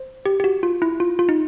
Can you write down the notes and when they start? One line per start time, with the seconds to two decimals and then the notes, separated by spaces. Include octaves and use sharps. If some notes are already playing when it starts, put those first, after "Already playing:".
Already playing: C5
0.26 G4
0.40 G4
0.44 F#4
0.63 F4
0.82 E4
1.00 F4
1.19 F4
1.29 D#4